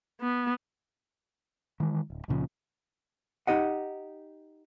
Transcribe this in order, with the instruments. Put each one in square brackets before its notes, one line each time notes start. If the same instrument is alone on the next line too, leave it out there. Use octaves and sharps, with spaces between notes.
[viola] B3
[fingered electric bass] D#3 E3 G#3
D1
C#2 A#2 C#3 F3
[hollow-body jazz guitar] D#4 G4 D#5 F#5